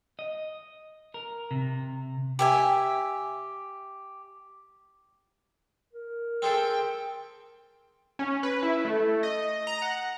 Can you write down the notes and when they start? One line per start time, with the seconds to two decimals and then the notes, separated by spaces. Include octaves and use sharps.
0.19 D#5
1.14 A#4
1.51 C3
2.39 G4 E5 G#5
5.93 A#4
6.42 C4 G#4 A4 G5
8.19 C#4
8.43 B4
8.63 E4
8.85 A3
9.23 D#5
9.67 A#5
9.82 F#5